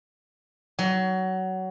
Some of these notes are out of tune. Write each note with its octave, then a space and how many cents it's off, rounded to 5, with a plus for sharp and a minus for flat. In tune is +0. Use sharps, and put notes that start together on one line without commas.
F#3 +20